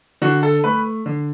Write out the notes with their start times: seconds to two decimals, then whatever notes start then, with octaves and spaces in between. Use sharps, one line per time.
0.22 D3 F#4
0.43 A4
0.64 A3 B4
1.06 D3